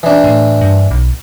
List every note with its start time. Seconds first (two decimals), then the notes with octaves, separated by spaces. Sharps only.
0.03 E3 D4
0.24 A2
0.61 G2
0.91 B1